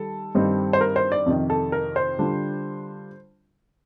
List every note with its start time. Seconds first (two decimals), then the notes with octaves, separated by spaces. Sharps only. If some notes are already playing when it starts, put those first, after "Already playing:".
Already playing: D#3 G3 A4
0.35 G2 D#3 G3 C4
0.73 C5
0.81 A#4
0.96 C5
1.12 D5
1.26 F2 C3 D#3
1.50 A4
1.72 A#4
1.96 C5
2.19 D3 G3 D4 F4